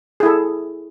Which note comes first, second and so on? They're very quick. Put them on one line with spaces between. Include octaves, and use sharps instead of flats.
G#4 E4 A4